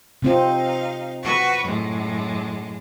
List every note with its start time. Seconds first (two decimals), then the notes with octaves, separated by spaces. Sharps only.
0.22 C3 C4 D#4 F4 F5
1.23 F#4 B4 C#6
1.64 F#2 A2 G#3